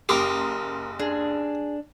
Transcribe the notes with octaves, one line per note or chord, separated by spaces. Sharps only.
F#1 G4 A#4 A#5 C6 D#6
D4 G#4